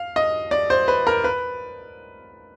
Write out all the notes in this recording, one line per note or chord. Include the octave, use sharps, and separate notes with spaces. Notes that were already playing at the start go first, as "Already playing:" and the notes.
Already playing: F5
D#5
D5
C5
B4
A#4
B4